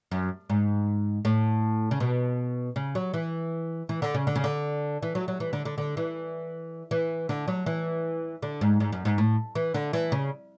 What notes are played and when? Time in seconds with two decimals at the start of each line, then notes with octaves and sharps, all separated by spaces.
0.11 F#2
0.50 G#2
1.25 A2
1.91 C#3
2.00 B2
2.76 C#3
2.95 F#3
3.14 E3
3.89 E3
4.02 D3
4.14 C#3
4.27 D3
4.35 C#3
4.44 D3
5.02 E3
5.15 F#3
5.28 F#3
5.40 E3
5.53 D3
5.65 D3
5.78 D3
5.97 E3
6.91 E3
7.29 D3
7.48 F#3
7.66 E3
8.42 D3
8.61 G#2
8.80 G#2
8.93 F#2
9.05 G#2
9.18 A2
9.55 E3
9.74 D3
9.93 E3
10.12 C#3